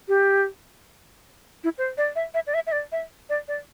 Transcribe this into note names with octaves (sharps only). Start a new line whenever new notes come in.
G4
E4
C5
D5
E5
E5
D5
E5
E5
D5
E5
D5
D5